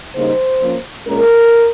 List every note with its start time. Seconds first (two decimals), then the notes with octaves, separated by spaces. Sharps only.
0.15 C#3 G3 A#3 D#4 C5
0.60 F3 A#3 C#4
1.05 A#2 G#3 C#4 A#4